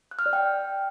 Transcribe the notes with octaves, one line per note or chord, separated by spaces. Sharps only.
F#6
F6
D5
G5